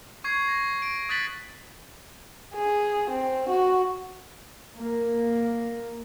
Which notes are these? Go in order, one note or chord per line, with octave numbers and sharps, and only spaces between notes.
C#6 G#6 C7
A#6
D7
D#6 F#6 A6 B6 F#7
G#4
C4
F#4
A#3